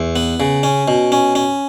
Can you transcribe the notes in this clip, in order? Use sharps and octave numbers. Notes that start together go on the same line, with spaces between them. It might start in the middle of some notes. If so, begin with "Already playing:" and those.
Already playing: E2
B3
C#3
C#4
B2
C#4
C#4